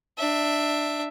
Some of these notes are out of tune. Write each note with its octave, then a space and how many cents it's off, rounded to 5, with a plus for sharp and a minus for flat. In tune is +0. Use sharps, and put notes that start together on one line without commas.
D4 +15 E5 +0